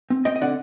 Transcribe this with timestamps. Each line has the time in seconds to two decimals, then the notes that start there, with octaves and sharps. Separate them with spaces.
0.10 C4
0.25 C4 D#5 G5
0.36 D#5
0.41 D3 D5 F#5